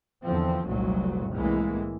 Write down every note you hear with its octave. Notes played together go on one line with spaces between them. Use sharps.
E2 D3 F3 C4
F1 C2 A#2 F#3
C2 A2 E3 G#3 A#3